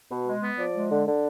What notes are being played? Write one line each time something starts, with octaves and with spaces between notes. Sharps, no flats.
B2
G#3
B3
F3 D5
G#3
D3
D3